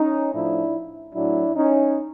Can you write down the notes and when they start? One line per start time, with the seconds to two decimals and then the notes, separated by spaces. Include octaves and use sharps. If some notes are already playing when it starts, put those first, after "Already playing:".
Already playing: C#4 D#4
0.34 A2 F3 D4 E4
1.15 A2 F#3 D4 E4
1.55 C#4 D#4